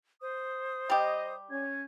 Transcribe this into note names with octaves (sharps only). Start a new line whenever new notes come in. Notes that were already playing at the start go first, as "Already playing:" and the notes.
C5 D#6
G3 G4 D#5
C#4 G#6